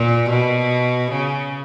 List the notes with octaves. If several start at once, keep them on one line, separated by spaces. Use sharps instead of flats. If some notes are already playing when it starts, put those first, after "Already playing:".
Already playing: A#2
B2
C#3